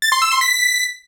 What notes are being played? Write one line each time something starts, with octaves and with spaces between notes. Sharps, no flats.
A6
C6
E6
C6
B6